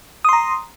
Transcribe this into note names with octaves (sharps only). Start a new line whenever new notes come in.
A#5 C6 D#6